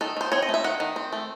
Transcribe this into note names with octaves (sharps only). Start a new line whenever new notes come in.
D#3 A4
D#3 C5
C4 C#5
D#5
A3 E5
D#3 F#5
D#3
C4
A3